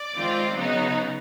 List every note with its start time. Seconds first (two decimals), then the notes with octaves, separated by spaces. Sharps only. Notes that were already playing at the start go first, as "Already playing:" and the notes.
Already playing: D5
0.15 D#3 G#3 C4 F4
0.56 C#3 F#3 B3 D#4